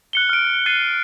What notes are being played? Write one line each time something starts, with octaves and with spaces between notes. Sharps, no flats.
F#6 C#7 G7
F6 D7
F#6 A6 C7 D#7